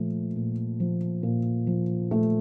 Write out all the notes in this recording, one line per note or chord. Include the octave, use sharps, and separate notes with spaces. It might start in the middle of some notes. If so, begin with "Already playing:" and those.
Already playing: A#2 F3 A3
A#2
F3
A#2
F3
A#2 A3